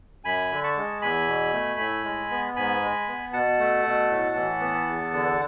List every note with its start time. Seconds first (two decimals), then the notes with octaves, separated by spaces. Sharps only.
0.25 F#2 G#5 B5
0.51 D3
0.64 A5 C#6
0.77 G#3
1.02 E2 G#5 B5
1.27 B2
1.54 A3
1.80 A2
2.04 G#3
2.31 B3
2.56 G#2 G#5 B5
2.82 G#3
3.08 B3
3.33 B2 F#5 A5
3.59 A3
3.85 B2
4.10 A2
4.36 E3
4.61 B3
4.87 E2
5.13 D3